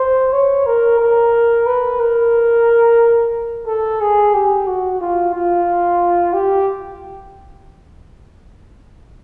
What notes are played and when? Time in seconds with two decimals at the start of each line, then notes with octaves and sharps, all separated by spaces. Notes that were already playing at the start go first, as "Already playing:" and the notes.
Already playing: C5
0.33 C#5
0.66 A#4
1.00 A#4
1.67 B4
2.00 A#4
3.66 A4
4.01 G#4
4.34 G4
4.67 F#4
5.01 F4
5.34 F4
6.34 G4